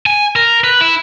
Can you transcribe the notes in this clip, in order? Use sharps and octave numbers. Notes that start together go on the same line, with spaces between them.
G#5
A#4
B4
E4